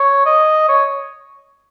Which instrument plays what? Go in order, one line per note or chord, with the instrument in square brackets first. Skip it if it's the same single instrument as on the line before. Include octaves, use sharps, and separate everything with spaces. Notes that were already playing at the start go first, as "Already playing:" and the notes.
Already playing: [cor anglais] C#5
D#5
C#5